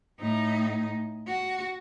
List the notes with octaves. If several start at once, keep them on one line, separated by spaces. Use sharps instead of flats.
A2 D#4
F#4